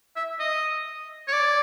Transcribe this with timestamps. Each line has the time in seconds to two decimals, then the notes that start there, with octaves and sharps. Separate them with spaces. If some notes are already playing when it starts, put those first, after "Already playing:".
0.16 E5
0.39 D#5
1.28 C#5
1.33 D5